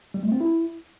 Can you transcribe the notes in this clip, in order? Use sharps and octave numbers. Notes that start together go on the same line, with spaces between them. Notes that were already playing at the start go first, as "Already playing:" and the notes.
G3
A3
C4
E4